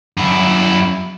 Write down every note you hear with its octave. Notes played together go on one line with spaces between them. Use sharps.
F#2 E4